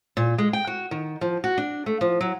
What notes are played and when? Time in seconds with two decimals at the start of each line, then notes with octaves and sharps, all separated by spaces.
0.17 A#2
0.38 G#3
0.53 G5
0.67 F#4
0.91 D#3
1.21 F3
1.44 F#4
1.58 D4
1.86 A3
2.01 F3
2.21 F#3